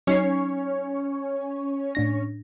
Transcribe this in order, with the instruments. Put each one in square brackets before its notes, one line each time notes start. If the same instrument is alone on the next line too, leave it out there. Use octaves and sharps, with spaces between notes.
[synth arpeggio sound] F#3 D#4 C7 [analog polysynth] C#4 C#5
[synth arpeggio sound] A2 D4 A#6